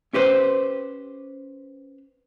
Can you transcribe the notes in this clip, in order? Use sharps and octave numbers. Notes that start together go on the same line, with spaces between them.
C#4 G4 B4 C5